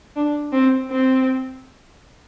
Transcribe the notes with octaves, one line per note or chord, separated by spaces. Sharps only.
D4
C4
C4